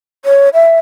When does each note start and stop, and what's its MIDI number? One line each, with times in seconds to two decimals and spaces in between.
0.25 0.49 73
0.54 0.79 76